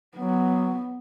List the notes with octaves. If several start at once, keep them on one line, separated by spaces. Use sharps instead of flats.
F#3 B3